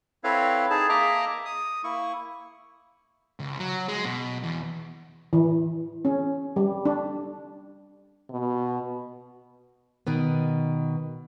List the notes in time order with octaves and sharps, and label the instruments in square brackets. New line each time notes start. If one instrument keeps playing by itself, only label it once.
[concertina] C4 E4 A4 B4 C#5 F5
D#4 G#4 A5
A#3 G#4 D#5 E5 A#5 D6
D#6
A#3 E4 C#6
[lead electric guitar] C#2
F#3
G#3
B2
E2
[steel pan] E3
C#4
G3
D4
[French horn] B2
[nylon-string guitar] B2 D#3 B3